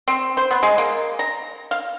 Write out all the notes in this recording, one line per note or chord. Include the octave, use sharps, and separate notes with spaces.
C4
C5
B3
G#3
A#3
A#5
F5